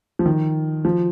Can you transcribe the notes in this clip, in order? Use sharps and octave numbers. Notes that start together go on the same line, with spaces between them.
F3
D#3
F3